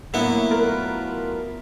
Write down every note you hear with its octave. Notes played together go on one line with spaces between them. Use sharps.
A2 F#3 A#3 B3 D4 E4 F#5
F4 A#4 B4